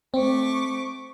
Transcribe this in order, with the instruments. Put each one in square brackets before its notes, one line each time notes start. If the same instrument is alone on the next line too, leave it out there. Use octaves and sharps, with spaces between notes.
[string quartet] A3 C#6 D6 [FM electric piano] C4